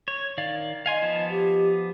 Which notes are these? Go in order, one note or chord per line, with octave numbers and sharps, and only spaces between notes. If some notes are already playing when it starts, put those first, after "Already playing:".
C#5
D#3 D5 F5
D#5 F5 G#5 C6
F3 B3 A5
G4